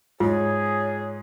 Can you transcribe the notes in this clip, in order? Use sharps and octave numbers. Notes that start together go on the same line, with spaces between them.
G#2 F4 G#4 C#5